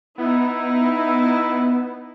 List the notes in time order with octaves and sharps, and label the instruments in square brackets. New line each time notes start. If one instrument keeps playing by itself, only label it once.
[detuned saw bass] B3 [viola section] D#4 E4